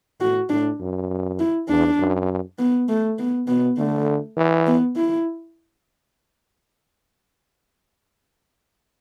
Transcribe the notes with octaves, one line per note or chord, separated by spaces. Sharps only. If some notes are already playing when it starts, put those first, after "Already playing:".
A2 F#4
A2 D4
F#2
E4
E2 D4
F#2
B3
A3
B3
B2 B3
D3 A3
E3
B3
E4